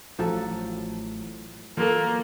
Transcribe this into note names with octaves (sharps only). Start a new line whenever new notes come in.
A1 F3 F#3 A4
E3 F#3 A#3 F4 A4